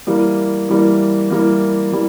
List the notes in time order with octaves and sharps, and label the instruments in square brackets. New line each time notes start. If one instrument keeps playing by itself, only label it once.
[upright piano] E3 G3 A#3
E3 G3 A#3
E3 G3 A#3
E3 G3